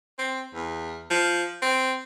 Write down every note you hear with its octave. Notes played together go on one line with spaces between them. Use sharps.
C4
E2
F3
C4